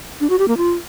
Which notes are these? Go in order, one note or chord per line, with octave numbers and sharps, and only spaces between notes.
D4
F#4
G4
A#3
F4